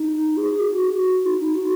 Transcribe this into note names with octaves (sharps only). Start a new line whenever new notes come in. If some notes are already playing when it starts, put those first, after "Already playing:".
Already playing: D#4
G#4
F#4
F#4
D#4
D#4
F#4